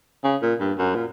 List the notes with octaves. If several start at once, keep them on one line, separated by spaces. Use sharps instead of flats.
C#3
A#2
G2
F#2
A#2